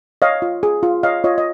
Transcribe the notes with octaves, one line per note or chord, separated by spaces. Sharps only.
C#5 D#5 F5
F4
G#4
F4
C#5 D#5 F5
F4 C#5 D#5
D#5